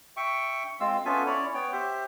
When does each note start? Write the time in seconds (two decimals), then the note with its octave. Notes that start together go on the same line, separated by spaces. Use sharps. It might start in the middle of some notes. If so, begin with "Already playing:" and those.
0.17 E5 G5 C#6
0.80 G#3 C4 F4 F5 E6
1.05 B3 C#4 F4 A4 E5 G#5
1.26 C#4 E4 C#5 D5
1.54 B3 C#5 G5
1.72 G4 C5 E5